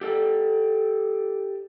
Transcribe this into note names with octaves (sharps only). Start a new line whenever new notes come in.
G4 A4 D5 G5